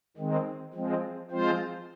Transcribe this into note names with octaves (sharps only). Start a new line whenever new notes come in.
D#3 G#3 C4
F3 G#3 C4
F3 G#3 C4 F4 C5